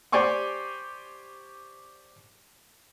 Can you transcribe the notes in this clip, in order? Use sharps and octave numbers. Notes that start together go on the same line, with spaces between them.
G4 C5 D5 G#5 C#6 D6